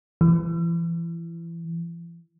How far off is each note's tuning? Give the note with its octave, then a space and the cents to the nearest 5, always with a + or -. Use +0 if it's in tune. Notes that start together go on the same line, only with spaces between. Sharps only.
E3 +30